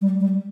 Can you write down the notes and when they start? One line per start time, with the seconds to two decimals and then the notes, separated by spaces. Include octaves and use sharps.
0.02 G3
0.20 G3